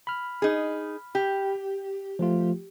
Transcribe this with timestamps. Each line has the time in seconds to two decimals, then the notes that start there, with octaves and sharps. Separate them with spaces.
0.07 B5 F6
0.42 D#4 G#4
1.15 G4
2.19 F3 A3 F4